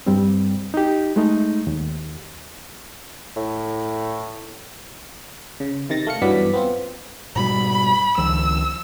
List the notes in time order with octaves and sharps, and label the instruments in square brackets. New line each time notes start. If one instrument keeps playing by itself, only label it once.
[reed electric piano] G2 G3 C4
D#4 G4
G#3 A3 D#4
D#2
[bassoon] A2
[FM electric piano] C#3
C3 D#3 A6 A#6
A3 F5 C#7
G2 E3 F#3 B3 D5 B6
B3 C4 F4
[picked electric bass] G#2 B2 G3 [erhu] B5
[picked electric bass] C#2 D#3 F3 [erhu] E6